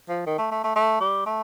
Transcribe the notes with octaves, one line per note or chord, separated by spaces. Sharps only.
F3
D#3
A3
A3
A3
A3
G3
A3